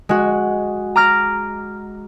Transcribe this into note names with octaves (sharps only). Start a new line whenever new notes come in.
G#3 F#4
A#5 D6 F6 A#6